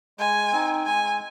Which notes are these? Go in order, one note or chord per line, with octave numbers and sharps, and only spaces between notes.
G#3 G#5
C4 D#4
G#3 G#5